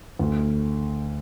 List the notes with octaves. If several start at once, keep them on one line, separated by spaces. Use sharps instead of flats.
D2